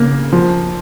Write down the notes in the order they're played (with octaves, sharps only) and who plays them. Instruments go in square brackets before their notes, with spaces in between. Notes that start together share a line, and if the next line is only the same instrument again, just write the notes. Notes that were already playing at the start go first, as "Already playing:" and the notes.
Already playing: [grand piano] C#3 A#3
F3